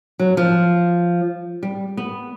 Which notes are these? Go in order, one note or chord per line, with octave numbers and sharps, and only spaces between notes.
F#3
F3
G3
B3